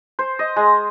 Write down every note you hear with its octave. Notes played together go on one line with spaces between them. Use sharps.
C5
D#5
G#3